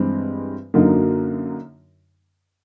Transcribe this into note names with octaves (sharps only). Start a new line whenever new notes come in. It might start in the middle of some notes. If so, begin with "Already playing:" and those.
Already playing: G2 E3 G#3 C4
F#2 D3 F#3 A#3 D#4